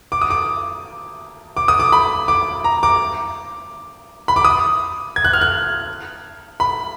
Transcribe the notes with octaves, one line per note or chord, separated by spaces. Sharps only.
D6
D#6
D6
D6
D#6
D6
B5
D6
A#5
D6
B5
D6
D#6
G#6
F#6
F6
F#6
B5